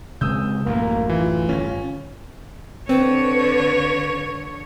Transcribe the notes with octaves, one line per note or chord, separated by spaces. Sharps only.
C#3 G#3 C4 D#6 E6 G6
A1 F#2 A2 A#3
E3 F4
G1 A2 C#4
D3 C4 B4 C#5